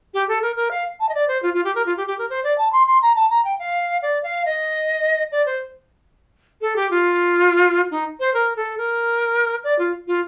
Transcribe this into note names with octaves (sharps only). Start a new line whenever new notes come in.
G4
A4
A#4
A#4
F5
A5
D#5
D5
C5
F4
F4
G4
A#4
F4
G4
G4
A#4
C5
D5
A5
C6
C6
A#5
A5
A#5
G5
F5
D5
F5
D#5
D5
C5
A4
G4
F4
D#4
C5
A#4
A4
A#4
D5
F4
F4